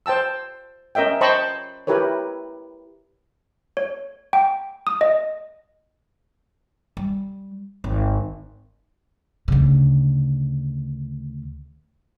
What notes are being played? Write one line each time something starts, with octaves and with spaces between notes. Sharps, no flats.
C5 G5 A5 E6
C#4 A#4 D#5 E5 G5
C5 D#5 G5 A5 B5 C#6
E4 G4 A#4 B4 C#5
C#5
G5
D#6
D#5
G3
G#1
D2 C#3